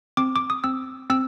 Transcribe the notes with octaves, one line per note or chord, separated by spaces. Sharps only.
C4 D6
D6
D#6
C4 E6
C4 E6